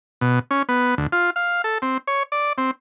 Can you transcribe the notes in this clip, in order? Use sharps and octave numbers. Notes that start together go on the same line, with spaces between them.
B2
C#4
B3
D2
F4
F5
A4
C4
C#5
D5
C4